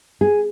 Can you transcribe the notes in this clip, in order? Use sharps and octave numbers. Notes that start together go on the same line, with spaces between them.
G#4